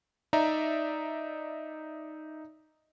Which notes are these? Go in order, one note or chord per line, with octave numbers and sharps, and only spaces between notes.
D#4 D5 E5 A#5